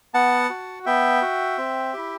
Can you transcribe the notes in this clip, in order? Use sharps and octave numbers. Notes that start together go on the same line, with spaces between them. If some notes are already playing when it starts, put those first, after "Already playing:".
B3 F#5 A5
F#4
B3 E5 G5
F#4
C4
E4 G4